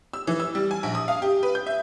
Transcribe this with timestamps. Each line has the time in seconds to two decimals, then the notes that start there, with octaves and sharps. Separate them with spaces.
0.13 E6
0.27 E3
0.40 E6
0.55 G3
0.71 G#5
0.83 A#1
0.95 D#6
1.08 F5
1.22 G4
1.43 B4
1.55 G6
1.66 E5